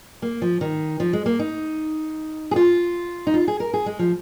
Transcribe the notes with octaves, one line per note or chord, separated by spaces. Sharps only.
A#3
F3
D#3
F3
G#3
A#3
D#4
G#4
F4
D#4
F4
G#4
A#4
G#4
G#3
F3